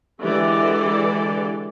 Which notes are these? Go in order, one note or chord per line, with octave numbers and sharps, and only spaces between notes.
D3 E3 G#3 G4 A4 D5